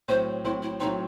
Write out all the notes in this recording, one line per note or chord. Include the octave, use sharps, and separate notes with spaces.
A2 F#3 C4 C5
A2 F#3 C4 E4
E4
A2 F#3 C4 D#4